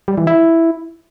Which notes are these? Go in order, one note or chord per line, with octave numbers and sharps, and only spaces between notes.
G3
E3
E4